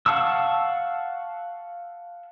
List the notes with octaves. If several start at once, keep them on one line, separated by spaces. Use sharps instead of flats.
F5 F#5 A5 C#6 E6